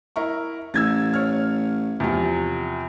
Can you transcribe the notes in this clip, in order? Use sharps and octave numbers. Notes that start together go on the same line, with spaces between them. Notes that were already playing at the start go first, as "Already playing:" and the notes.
E4 A#4 C#6
A1 E6 G#6 A6
C#5 F6
E2 C3 F3